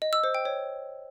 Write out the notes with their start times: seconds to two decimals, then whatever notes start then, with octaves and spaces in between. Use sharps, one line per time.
0.02 D#5
0.13 E6
0.24 C5
0.35 G5
0.45 C#5